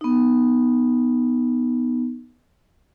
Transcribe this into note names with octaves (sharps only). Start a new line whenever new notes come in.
B3 D#4